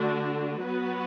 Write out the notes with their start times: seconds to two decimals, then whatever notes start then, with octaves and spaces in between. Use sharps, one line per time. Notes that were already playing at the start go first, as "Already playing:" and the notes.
Already playing: D3 A3 D4 F#4
0.63 F#3 B3 F#4 B4